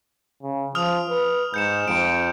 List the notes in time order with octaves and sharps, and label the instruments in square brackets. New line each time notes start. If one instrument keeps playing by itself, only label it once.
[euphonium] C#3
[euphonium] F3 [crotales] D#6 F6 F7
[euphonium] B4
[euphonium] G#2 [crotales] G6 C#7 E7
[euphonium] F2 [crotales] D7